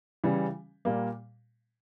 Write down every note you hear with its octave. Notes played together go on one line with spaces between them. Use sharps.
C#3 E3 G3
A#2 G3 A#3